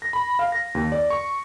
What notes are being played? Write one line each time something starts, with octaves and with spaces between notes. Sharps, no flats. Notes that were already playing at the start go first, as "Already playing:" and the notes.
A#6
B5
F5
A#6
D#2
D5
C#6